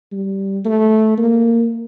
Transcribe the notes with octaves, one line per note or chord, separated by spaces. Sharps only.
G3
A3
A#3